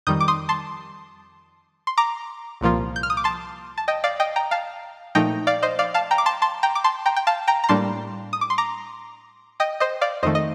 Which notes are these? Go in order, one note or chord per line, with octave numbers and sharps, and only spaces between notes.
F2 D#3 G3 D#6 G6
D6
C6 D#6
A5 C6
C6
A#5 D6
C2 A#2 F3 A#3 F4
G6
F6
D#6
D6
A5 C6
A5
D#5 G5
D5 F5
D#5 G5
G5 A#5
F5 A5
A#2 F3 A3 D#4 G5 A#5
D5 F5
C5 D#5
D5 F5
F5 A5
G5 A#5
D6
A5 C6
A5 C6
G5 A#5
D6
A5 C6
G5 A#5
G5
F5 A5
G5 A#5
A#5
A2 G3 A#3 D4 A5 C6
D#6
D6
C6
A#5 D6
D#5 G5
C5 D#5
D5 F5
F2 D#3 A3 C5 D#5
D#5